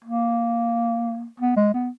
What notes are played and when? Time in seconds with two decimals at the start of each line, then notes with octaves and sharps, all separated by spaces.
0.04 A#3
1.40 B3
1.57 G#3
1.74 B3